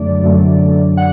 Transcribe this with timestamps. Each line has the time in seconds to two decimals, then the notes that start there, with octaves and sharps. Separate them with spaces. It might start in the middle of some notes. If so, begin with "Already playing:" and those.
Already playing: F#2 D3 F#3 A3 D4 D5
0.22 F#2 D3 F#3 A3
0.97 F#5